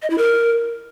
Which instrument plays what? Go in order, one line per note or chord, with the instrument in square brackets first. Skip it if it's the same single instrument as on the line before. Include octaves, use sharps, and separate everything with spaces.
[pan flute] D#5
E4
A#4